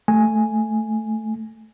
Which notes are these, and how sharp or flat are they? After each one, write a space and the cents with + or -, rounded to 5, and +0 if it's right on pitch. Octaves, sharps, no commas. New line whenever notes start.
A3 +0 G#5 +0